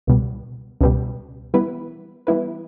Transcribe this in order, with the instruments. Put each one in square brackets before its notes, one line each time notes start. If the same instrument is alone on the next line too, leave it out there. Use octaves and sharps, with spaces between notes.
[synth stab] C#2 B2 G3
C#2 B2 G3
E3 G3 B3 E4 B4
E3 G3 B3 E4 B4